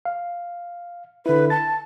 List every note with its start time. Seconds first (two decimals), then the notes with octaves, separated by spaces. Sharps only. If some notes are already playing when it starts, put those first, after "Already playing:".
0.05 F5
1.26 D3 E4 B4
1.50 A5 A6